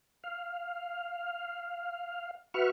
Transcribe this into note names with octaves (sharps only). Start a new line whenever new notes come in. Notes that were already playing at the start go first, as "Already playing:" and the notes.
F5
F#4 B4 E5 C#6 F6